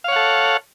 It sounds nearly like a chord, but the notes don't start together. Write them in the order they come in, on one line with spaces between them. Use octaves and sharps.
F5 C#5 F#5 A4